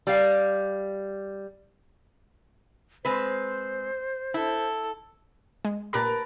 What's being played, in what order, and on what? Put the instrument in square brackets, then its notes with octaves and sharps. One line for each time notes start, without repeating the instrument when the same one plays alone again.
[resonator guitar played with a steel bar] G3 F5
[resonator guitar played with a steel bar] G#3 C4 B4 [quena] C5
[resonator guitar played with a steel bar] E4 [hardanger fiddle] A4
[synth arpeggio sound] G#3
[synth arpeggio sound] A#2 G4 B5 [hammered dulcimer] A#4 B4 A5